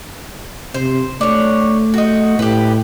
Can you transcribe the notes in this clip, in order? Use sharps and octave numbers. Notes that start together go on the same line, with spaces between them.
C3 C5
A3 D4 C#5
D#4 F#4
A2 G4 B4